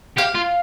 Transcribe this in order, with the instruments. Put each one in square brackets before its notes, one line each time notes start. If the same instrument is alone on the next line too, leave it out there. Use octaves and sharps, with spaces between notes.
[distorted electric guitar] G4 [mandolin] F5
[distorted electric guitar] F4